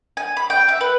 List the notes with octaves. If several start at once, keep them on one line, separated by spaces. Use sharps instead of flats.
G#5
B5
G5
E5
B4